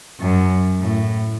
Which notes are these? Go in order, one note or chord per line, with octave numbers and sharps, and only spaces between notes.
F#2
A2